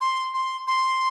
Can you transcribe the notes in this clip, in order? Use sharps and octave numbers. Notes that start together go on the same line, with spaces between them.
C6
C6
C6